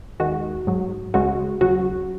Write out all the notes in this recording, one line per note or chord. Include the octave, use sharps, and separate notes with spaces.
D#2 D#3 G#3 F#4
G#2 F#3
C#2 C#3 G#3 F#4
D#2 C#3 F#3 F#4